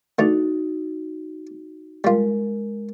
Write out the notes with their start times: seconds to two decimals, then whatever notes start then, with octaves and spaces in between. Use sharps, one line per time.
0.19 D3 A3 D#4 F#4
2.04 G3 G#3 F4 A#4